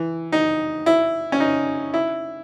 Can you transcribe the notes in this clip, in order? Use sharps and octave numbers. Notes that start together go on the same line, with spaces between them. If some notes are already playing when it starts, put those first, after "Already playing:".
Already playing: E3
D#4
E4
C#4
D#4
E4